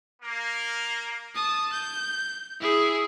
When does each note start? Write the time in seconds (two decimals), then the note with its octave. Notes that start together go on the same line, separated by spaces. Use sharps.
0.22 A#3
1.35 A5 D#6
1.73 G6
2.60 E4 G#4